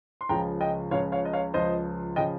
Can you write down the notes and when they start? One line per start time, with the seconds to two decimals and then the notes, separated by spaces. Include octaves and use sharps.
0.21 C6
0.29 C#2 C#3 F3 G5 A#5
0.61 D#5 G5
0.91 C#2 C#3 F3 C#5 F5
1.12 C#5 F5
1.25 D#5
1.33 C#5 F5
1.54 C#2 C#3 F3 C5 D#5
2.16 C#3 F3 D#5 G5